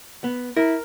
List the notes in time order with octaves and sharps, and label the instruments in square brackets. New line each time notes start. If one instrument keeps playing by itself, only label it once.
[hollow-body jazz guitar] B3
[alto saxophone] E4 [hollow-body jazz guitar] A#4